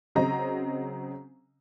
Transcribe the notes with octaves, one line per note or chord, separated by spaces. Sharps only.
C#3 F#3 C4 D#5 A#5